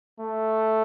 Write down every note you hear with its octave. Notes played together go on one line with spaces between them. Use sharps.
A3